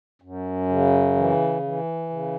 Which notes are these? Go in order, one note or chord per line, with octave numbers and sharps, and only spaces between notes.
F#2
C#3
E3
E3
C#3